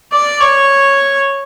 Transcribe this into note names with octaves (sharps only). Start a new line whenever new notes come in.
D5
C#5